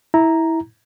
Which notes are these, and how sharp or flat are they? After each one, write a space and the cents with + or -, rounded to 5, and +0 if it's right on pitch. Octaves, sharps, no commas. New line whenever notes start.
E4 -15 A#5 +0